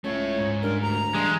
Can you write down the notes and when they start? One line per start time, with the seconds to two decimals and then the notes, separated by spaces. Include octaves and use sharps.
0.04 C#2 A3 E4 C#5
0.39 G#2
0.63 G2 A#4
0.82 D2 A#5
1.14 G2 E3 G#3 C6